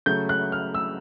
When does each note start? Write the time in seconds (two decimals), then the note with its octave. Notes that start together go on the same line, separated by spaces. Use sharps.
0.06 C#3 F#3 A3 G6
0.29 F#6
0.52 F6
0.74 E6